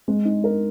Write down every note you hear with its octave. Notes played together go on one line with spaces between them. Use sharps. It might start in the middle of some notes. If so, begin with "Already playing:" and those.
G#3
D#4
A#4